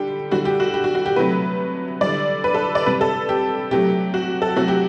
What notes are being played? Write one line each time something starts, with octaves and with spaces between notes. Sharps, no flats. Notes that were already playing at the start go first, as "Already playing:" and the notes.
Already playing: D3 G3 G4
D3 G3 F#4
G4
F#4
G4
F#4
F#4
G4
C3 F#3 A3 B4
D3 G3 D5
B4
A4
D5
C3 G3 B4
A4
G4
C3 F#3 A3 G4
F#4
A4
C3 F#3 A3 F#4
G4